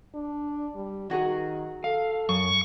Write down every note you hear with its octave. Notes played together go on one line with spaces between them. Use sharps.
D4
G3
D#3 F#3 F#4 G#4
A4 F5
F#2 C#6